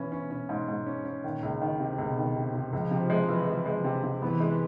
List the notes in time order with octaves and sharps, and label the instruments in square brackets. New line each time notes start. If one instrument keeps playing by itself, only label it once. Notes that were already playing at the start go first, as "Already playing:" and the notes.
Already playing: [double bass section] B2 [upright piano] E3 C#4
[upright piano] C#4
C#4
G#2
G#2
C#4
C#4
[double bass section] A#2 [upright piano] D#3
[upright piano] C#2
D#3
C3
[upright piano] C#2 [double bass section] B2
[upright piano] D#3
C3
C3
[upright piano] C#2 [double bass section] F3
[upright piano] C3
G#3
E3
G#3
G#3
C3
C3
[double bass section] E3 [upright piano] B3
[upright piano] G#3